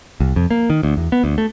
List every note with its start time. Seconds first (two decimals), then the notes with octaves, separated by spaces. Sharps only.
0.20 C2
0.36 F2
0.51 A#3
0.70 D#3
0.83 D2
0.97 E2
1.12 B3
1.24 D2
1.38 A3